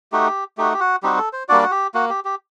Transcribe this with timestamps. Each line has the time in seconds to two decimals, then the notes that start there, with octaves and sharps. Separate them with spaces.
0.12 A3 D#4 F#4 G4
0.57 A3 D#4 F#4 G4
0.74 G4
0.80 F#4
1.03 G3 C4 D#4 F#4 G4
1.18 A4
1.33 C5
1.49 G3 A#3 D4 F#4 D5
1.63 F#4
1.71 G4
1.94 A#3 F#4
2.09 G4
2.25 G4